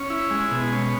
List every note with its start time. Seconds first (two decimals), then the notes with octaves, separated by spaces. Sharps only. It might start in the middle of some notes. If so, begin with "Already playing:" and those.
Already playing: C#4
0.10 E4
0.31 G#3
0.51 B2
0.72 C#4